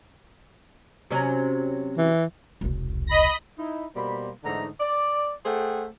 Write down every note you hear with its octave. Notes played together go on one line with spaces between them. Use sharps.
C3 F#3 C#4
E3
E1 C2
D#5 B5 A#6
D#4 E4
B2 G3 A#3 C5 B5
G#2 D3 E3 A3 D#4 A#5
D5
A3 G#4 C5 F#5 G5